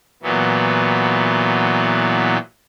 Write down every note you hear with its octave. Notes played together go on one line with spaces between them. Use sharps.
A#2 E3 F#3 B3